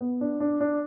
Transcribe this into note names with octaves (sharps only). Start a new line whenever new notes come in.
B3
D4
D4
D4